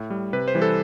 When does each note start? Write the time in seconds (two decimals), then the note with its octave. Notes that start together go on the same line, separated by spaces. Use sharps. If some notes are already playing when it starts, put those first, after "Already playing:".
Already playing: A2
0.10 G3
0.33 C3 B4
0.48 C5
0.55 E3 G3
0.62 A4